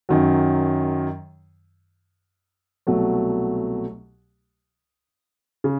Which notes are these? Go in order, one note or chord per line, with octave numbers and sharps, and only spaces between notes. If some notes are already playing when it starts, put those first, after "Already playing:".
F#2 D#3 F#3
C2 B2 F#3 A3
C#3